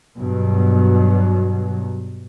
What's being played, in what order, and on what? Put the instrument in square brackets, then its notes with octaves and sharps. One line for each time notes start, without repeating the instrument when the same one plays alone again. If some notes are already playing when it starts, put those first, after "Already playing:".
[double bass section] G2 B2 F#3